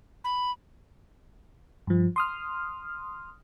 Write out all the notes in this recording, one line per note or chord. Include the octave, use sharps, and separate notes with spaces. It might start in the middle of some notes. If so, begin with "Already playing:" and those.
B5
G2 F3
C6 D#6 F6